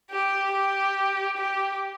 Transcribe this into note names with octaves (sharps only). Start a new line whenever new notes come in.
G4
G4
G4